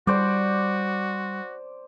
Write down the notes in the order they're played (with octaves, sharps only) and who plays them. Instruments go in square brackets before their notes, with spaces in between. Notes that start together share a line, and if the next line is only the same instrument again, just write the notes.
[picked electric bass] G3 [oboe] F#4 [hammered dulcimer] C5 D5